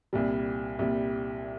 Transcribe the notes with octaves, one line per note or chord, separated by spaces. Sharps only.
C2 A#2 G3
C2 A#2 G3